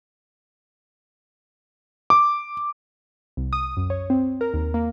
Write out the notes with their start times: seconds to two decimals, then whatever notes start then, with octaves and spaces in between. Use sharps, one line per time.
2.10 D6
3.37 C2
3.53 D#6
3.77 F#2
3.90 C#5
4.10 C4
4.41 A#4
4.54 D#2
4.74 A#3